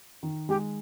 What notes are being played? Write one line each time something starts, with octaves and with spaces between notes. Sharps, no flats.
D#3
G#3 G4